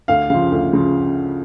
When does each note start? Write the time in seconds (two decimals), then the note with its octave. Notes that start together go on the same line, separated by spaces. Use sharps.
0.08 D2 F5
0.30 C#3 F3 F5
0.52 D2
0.73 C#3 F3